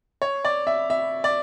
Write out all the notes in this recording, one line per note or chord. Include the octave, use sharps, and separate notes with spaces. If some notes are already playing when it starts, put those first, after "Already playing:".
C#5
D5
E5
E5
D5